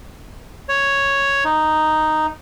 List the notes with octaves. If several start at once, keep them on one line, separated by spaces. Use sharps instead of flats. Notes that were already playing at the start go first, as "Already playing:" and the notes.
C#5
D#4